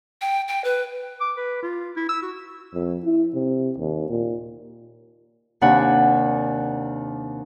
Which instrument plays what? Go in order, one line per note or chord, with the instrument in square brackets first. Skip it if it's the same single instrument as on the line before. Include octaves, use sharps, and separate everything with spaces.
[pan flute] G5
G5
B4
[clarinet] D6
B4
F4
E4
E6
F#4
[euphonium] F2
E4
C3
D#2
A#2
[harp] D#2 C3 D4 F#5 G#5 B5